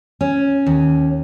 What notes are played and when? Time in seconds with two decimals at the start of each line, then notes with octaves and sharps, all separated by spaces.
0.21 C#4
0.66 D#2